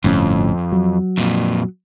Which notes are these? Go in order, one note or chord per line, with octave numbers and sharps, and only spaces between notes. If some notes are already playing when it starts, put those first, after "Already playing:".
G1 F2 A2 C#4
F#3
F2 A#2